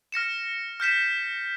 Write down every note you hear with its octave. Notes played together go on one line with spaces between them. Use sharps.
F6 A#6 C#7 E7
F6 G6 B6 E7